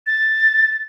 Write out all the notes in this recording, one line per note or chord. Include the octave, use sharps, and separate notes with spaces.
A6